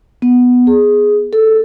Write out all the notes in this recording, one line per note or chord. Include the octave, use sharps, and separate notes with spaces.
B3
G#4
A4